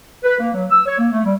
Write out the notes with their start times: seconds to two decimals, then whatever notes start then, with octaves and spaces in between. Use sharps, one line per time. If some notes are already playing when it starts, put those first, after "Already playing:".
0.23 B4
0.40 A#3
0.54 F#3
0.70 E6
0.86 C#5
0.99 A#3
1.12 A3
1.25 G3